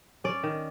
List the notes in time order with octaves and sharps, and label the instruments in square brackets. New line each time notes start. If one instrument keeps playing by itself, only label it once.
[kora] C#4 D5
D#3